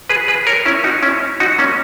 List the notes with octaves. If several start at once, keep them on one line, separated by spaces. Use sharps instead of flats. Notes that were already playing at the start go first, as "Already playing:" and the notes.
G#4 B4
G#4 B4
A#4 C#5
C#4 E4
D#4 F#4
C#4 E4
D#4 F#4
A#3 C#4